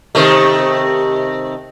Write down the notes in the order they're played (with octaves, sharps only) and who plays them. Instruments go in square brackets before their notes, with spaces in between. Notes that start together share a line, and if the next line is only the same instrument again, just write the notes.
[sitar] C3 D#3 A3